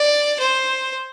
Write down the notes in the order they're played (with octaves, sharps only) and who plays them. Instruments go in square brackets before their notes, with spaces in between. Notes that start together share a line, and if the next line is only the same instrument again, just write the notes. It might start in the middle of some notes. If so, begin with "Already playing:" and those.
Already playing: [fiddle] D5
C5